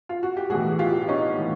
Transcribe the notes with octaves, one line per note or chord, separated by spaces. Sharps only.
F4
F#4
G4
B1 A2 E3 F#4 G#4
F4 G4
C#4 D#4
A2 E3